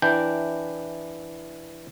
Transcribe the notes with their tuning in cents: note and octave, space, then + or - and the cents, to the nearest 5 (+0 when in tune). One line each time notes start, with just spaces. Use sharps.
E3 +0 D4 +0 G5 -5